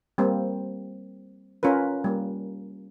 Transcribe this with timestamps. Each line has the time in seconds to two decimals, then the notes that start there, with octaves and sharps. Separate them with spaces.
0.18 G3 A#3 C4
1.63 C#4 F4 A#4 B4
2.04 G3 A#3